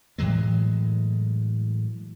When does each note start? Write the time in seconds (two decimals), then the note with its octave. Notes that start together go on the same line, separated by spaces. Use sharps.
0.18 A2 E3 F#3 G#3